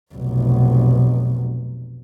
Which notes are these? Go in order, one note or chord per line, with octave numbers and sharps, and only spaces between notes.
F1 B1